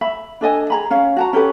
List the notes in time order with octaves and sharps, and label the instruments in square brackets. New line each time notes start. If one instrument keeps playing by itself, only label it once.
[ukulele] E5 B5
D4 A4 D#5 G#5
G#4 A#5 B5
C#4 F5
F#4 A5 A#5
C#4 G4 A4 B4